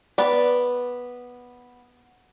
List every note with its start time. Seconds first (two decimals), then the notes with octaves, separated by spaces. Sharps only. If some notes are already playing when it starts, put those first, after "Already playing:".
0.18 B3 D5